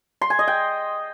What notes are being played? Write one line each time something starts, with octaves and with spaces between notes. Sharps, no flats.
C6
G#5
D#5
G5